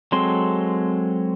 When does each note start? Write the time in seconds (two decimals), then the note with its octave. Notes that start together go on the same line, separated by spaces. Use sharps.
0.12 F#3 G#3 C4 A4 C6